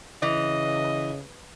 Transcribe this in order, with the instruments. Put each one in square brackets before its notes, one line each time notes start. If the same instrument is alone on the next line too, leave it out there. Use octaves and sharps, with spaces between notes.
[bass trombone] C#3 [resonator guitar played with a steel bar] E3 [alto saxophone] D#5